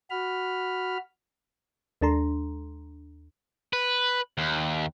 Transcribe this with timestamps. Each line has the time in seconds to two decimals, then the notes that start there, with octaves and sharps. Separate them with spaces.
0.10 F#4 B5 F6
2.01 D#2 G#3 D4 A4 A#5 C6
3.73 B4
4.38 D#2